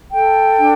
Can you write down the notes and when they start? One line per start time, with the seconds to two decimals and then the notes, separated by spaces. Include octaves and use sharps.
0.12 A4 G5
0.59 D4